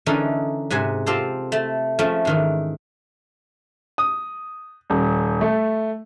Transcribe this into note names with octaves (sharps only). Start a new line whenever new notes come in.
D3 E3 C#4 D#4 A4 A#4
G#2 C3 F#5 G#5
C4 F4 G4 A4 C5
A3 A5
F3 A3 C#4
G#2 D#3 E3
D#6
D#1
A3